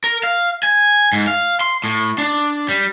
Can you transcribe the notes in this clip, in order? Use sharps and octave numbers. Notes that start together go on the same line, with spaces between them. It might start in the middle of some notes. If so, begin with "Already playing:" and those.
A#4
F5
G#5
G#2
F5
C6
A2
D4
G3